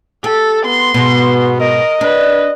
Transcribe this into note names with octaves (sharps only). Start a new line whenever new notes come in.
G4 A4
B3 C6
G#2 B2 B3
A#4 D#5
D4 B4